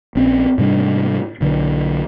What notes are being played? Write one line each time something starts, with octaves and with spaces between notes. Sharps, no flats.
A#1 C4 C#4
G#2 C3 G3 D4
B1 D3 F#3